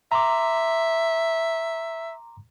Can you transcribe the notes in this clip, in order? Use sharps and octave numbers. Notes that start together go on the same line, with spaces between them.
E5 A#5 C6 D6